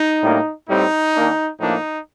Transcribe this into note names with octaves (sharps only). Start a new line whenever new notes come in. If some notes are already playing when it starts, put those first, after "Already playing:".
Already playing: D#4
A2 G3 A#3 D4
A2 G3 C4 D#4
D#3 A#3 D4
A2 F3 A#3 D4 D#4